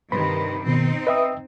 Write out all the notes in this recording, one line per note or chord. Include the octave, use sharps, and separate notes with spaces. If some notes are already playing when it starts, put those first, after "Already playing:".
G2 C3 D#3 B4 B5 C6
B2 D#3 B3 C4 D#4
B4 D#5 E5 G5 D#6 E6